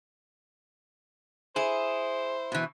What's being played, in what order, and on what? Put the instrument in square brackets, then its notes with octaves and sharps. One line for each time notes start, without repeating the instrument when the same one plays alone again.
[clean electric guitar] E4 [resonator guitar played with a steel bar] G#4 [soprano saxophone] C5
[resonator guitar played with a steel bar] B2 E3